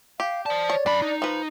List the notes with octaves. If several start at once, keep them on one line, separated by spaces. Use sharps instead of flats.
G4 F5
C5 D5 A5
C#5
F#2 D4 B5
D#4
F3 B4